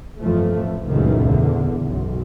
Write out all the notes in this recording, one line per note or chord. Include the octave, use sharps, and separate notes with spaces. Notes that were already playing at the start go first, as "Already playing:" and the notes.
G1 F2 E3 F3 A3
A1
C#2 F#2 A#2 D#3 E3 A3
E2 D3
B1 F#2